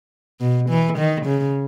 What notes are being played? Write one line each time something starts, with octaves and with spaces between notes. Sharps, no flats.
B2
E3
D#3
C#3